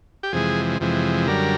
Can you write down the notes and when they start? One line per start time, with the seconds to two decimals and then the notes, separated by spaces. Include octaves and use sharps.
0.23 G4
0.33 F2 C3 E3 G#3 G#4
0.80 F2 C3 E3 G#3
1.28 F#2 D3 G3 A#4